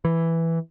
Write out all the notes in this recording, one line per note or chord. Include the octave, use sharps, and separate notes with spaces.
E3